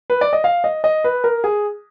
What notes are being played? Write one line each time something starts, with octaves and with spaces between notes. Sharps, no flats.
B4
D5
D#5
F5
D#5
D#5
B4
A#4
G#4